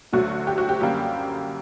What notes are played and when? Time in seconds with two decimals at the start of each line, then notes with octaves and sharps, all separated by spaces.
0.13 D2 D3 F#3 A3 F#4
0.47 G4
0.58 F#4
0.69 G4
0.81 F#2 D3 G3 A#3